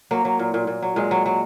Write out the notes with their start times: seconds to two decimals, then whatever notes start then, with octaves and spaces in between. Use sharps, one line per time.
0.11 F#3 A#3
0.25 F#3
0.39 A#2
0.54 A#2
0.67 A#2
0.82 F#3
0.96 A#2 G#3
1.11 F#3
1.26 F#3